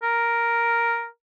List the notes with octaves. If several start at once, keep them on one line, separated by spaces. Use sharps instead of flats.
A#4